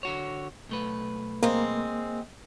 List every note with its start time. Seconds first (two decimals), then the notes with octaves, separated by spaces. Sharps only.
0.03 D3 F#4 C#5
0.69 B1 A3 B4
1.43 G#3 A#3 C4